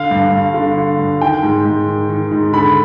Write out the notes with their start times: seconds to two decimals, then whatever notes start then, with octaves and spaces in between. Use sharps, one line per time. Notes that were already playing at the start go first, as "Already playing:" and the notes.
Already playing: D3 F5
0.11 G2
0.32 G2
0.54 D3
0.77 D3
0.99 G2
1.21 D#3 G5
1.43 G#2
1.65 G#2
1.87 D#3
2.09 D#3
2.31 G#2
2.53 D3 B5